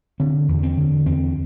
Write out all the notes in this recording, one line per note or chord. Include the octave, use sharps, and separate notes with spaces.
D3 C4
E2
C4
D3
E2 C4